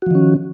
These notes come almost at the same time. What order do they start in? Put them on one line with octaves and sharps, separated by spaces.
F#4 F3 D#3 C#4